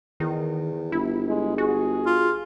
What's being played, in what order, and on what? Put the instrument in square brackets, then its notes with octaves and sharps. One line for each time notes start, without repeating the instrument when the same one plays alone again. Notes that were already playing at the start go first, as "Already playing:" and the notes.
[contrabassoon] E2 [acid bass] D#3
[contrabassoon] G1 [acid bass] E4
[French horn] G#3
[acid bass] F#4 [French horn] G#4
[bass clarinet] F4